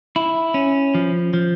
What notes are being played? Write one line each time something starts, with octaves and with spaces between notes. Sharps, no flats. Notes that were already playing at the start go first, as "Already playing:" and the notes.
E4
C#4
F3
F3